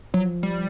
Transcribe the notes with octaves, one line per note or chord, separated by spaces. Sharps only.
F3 F#3
G3